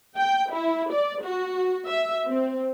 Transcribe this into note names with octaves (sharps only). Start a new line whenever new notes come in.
G5
E4
D5
F#4
E5
C4